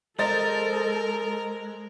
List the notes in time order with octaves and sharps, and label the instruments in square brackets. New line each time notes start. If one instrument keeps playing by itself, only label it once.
[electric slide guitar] G#3 [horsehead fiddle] A4 [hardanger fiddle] A#4 [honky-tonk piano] C5 D#5 A6